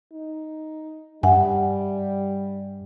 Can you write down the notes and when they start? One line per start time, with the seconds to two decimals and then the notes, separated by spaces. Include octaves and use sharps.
0.12 D#4
1.23 G2 G3 E5 F#5 G#5